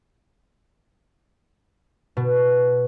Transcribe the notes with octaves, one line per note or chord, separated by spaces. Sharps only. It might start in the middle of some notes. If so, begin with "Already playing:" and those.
B2